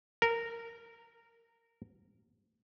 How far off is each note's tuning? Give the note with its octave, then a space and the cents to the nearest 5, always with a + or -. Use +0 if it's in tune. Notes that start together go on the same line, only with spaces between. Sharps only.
A#4 -15